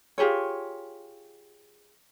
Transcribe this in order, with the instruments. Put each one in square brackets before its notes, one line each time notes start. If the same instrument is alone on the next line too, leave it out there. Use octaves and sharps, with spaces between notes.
[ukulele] F4 G4 G#4 C#5